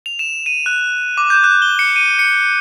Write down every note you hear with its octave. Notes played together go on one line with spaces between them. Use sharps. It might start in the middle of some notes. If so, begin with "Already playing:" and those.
F7
E7
D#7
F#6
D6
G6
F#6
G7
C#7
D#7
C#7